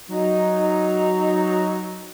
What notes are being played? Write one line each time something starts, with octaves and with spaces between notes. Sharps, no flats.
F#3 D#4